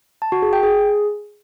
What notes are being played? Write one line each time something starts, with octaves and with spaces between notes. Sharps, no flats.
A5
F#4
G#4
G5
G#4